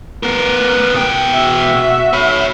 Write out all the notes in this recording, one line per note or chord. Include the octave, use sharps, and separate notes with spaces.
B3 A#4
B2 G5
F#4 E5
C#5 B5